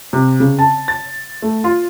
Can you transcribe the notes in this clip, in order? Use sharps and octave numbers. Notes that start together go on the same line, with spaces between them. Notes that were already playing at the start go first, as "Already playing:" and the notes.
C3
C#3
A5
A6
A3
F4